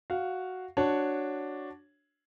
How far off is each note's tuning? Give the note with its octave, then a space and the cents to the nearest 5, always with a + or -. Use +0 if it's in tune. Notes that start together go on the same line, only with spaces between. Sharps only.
F#4 +0 F5 +0
D4 +0 F#4 +0 C#5 +0